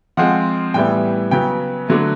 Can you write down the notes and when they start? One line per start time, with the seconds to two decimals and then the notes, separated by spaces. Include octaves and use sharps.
0.17 F3 G#3 C4 F#5
0.74 A2 E3 G3 B3 E4 G5
1.31 C#3 F#3 B3 G5
1.88 D3 F#3 A3